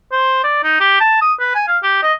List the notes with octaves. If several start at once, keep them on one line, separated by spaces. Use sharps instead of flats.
C5
D5
D#4
G4
A5
D#6
B4
G#5
F5
G4
D#5